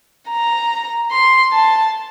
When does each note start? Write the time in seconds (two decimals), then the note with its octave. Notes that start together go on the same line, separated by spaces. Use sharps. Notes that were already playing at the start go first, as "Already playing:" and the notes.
0.30 A#5
1.11 C6
1.53 A5